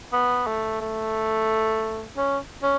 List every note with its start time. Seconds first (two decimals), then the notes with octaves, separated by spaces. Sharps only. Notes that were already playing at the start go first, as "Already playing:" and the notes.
0.13 B3
0.47 A3
0.81 A3
2.17 C#4
2.63 C#4